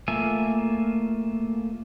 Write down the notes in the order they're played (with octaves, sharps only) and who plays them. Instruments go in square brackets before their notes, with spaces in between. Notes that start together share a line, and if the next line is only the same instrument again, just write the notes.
[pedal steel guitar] A3 A#3 F4 E5 G#5